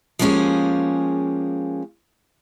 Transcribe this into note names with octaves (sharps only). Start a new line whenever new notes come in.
F3 G#3 A#3 C#4 G4 G#4